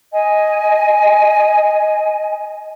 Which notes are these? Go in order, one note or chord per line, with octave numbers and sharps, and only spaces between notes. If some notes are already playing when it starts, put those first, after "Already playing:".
D#5 G#5